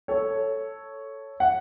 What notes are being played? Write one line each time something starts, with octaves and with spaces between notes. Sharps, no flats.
A4 C#5
F#5